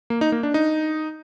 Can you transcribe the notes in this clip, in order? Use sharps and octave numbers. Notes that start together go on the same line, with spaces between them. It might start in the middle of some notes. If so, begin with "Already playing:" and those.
A#3
D#4
A#3
D4
D#4